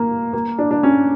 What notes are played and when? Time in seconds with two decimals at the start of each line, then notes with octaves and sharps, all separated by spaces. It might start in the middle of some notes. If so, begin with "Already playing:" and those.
Already playing: A#3
0.33 A#3
0.59 D4
0.71 D4
0.83 C#4